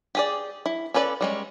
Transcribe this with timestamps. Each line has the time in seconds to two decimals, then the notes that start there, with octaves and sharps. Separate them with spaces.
0.15 G4 G#4 D5
0.66 E4
0.94 C#4 A4 B4 C#5 D5
1.21 G3 G#3 C#4